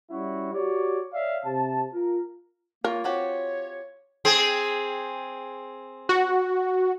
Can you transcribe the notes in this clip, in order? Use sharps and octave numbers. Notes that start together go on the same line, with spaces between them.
G3 C#4 E4 F#4
F#4 G4 C#5 D5
C#5 D5 E5 F5
C3 A5
F4 A#4
A#3 F4 A#4 C#5
C4 F#4 G4 C#5
C4 G#4
F#4